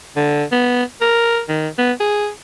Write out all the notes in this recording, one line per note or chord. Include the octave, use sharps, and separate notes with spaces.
D3
B3
A#4
D#3
B3
G#4